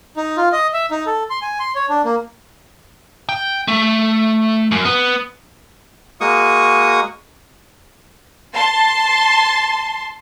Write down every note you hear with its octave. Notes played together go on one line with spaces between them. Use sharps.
D#4
F4
D#5
E5
D#4
A4
C6
G#5
C6
C#5
D4
A#3
G5
A3
F#2
B3
G#3 A#3 F#4 C#6 D#6
A5 C6